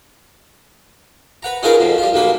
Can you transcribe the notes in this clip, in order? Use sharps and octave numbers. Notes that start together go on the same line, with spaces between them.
B4 F#5 A#5
C#4 D#4 F4 G#4 A#4 B4
F2 B2
G3 F4
B1 B2 A#3 B4